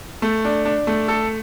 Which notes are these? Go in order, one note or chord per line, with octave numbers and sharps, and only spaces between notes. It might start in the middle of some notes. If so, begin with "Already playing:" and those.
A3
D4
D4
A3
A4